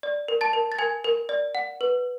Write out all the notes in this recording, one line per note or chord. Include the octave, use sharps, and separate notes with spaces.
D5
A#4
A5 A6
A#4
A6
A#4 G#5 G#6
A#4
D5
F#5
B4